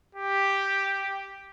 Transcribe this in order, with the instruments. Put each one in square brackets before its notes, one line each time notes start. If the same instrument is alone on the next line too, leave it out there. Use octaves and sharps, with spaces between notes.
[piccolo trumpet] G4